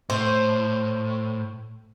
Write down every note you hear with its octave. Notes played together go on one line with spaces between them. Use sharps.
A2 C5